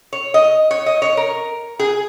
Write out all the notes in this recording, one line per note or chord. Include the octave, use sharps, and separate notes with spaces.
C#5
D#5
C#5
D#5
C#5
A#4
G#4